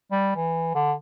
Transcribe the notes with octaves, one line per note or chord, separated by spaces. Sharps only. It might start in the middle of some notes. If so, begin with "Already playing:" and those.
G3
E3
D3